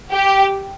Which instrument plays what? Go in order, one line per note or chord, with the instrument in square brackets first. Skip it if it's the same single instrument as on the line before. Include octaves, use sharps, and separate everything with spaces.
[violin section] G4